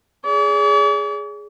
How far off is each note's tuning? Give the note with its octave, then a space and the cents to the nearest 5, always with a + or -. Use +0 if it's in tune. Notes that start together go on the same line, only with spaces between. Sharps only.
G#4 +0 D5 -45